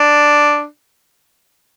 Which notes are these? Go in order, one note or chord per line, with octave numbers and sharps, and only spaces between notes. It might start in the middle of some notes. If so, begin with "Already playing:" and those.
Already playing: D4